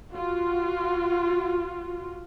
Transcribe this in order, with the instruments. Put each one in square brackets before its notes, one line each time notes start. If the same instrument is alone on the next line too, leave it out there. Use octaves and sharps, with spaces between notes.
[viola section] F4 F#4